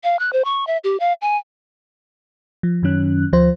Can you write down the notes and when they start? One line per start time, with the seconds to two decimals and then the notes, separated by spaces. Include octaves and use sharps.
0.04 F5
0.19 F#6
0.33 C5
0.45 C#6
0.67 E5
0.84 G4
1.00 F5
1.21 G#5
2.63 F3
2.83 F#2 D#3 F#3 C#4 F#6
3.33 D2 F3 F4 C5